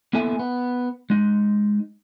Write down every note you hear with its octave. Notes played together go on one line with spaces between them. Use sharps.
A#3 B3 E4 A4 E5 G#5
B3
G#3 D#4